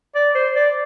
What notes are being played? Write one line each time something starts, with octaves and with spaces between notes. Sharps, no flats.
D5
C5
D5